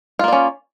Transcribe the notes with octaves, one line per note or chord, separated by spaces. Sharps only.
A#3 C#4 F4 D5